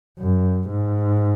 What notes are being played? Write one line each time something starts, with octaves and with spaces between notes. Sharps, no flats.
F#2
G#2